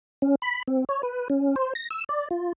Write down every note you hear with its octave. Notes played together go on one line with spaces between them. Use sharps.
C#4
B5
C4
C#5
B4
C#4
C5
A#6
E6
D5
F4